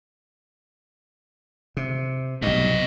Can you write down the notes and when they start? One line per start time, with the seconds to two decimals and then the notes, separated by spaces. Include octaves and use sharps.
1.77 C3
2.42 B1 G2 C3 D#5